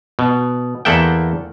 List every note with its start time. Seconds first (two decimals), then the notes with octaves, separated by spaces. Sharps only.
0.19 B2
0.85 E2 A#3 A4 E5 F#5 G5